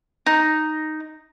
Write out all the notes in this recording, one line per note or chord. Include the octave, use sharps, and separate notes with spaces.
D#4